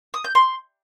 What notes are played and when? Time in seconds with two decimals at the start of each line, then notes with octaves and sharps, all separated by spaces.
0.14 D#6
0.24 G6
0.35 C6